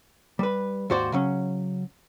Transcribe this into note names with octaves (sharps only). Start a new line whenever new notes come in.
G3 B4
D#2 G#2 F#4 C5 D5
C#3 F#3 C#4